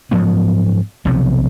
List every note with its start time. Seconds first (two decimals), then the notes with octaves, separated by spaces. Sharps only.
0.11 G#2 F3 F#3 B3
1.05 B1 C3 F3 B3